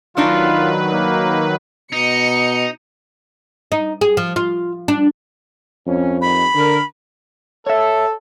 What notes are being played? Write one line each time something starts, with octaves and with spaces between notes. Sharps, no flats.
D#3 F#3 A3 D4 D#4 F4 B4
A#3
B2 D#4 C#7
D#4
G#4
F3
F4
D4
F2 C#4
D#3 G3 B5
D3 A#4
A4 C#5 E5